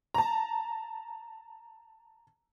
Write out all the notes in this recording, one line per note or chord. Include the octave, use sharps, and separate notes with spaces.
A5 A#5